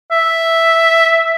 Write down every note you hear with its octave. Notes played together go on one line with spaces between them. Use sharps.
E5